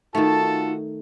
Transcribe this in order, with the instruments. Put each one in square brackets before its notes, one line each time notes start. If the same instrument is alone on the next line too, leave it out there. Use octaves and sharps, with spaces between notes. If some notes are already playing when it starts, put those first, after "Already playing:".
[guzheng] D#3 A3 [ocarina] D#4 [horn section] F4 F#4 A4 [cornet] A5